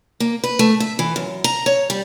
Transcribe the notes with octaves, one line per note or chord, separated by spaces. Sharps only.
A#3
B4
A3
E5
E3
F#2
A#5
C#5
G3